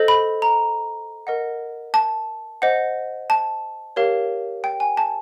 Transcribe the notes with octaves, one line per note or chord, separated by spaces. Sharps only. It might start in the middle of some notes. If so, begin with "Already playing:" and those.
Already playing: A4 C5 D#5
B5
A#5
A#4 D#5 F#5
A5
C5 D#5 F#5
A5
G4 A#4 C#5 F5
G5
G#5
A5